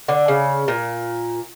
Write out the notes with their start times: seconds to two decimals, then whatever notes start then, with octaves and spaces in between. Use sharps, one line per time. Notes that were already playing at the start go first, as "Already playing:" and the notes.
0.08 D3
0.28 C#3
0.68 A#2